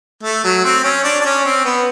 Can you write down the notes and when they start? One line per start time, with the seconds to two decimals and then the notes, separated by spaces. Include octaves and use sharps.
0.23 A3
0.44 F#3
0.64 C4
0.84 C#4
1.04 D4
1.21 D4
1.25 C#4
1.45 C4
1.65 B3